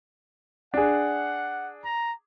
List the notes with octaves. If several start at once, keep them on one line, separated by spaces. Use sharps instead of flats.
D4 G#4 F#5
A#5